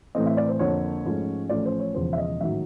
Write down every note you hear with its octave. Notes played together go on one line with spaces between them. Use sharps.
A2 E3 A3 C4 D#5
E5
D5
C5
F2 D3 F3 A#3 C#5
G#2 F3 A3 C#4
A1 A2 F3 A3 C#4 D5
C5
C#5
E1 E2 C#3 F3 C5
E5
D#5
A1 G#2 D#3 F#3 E5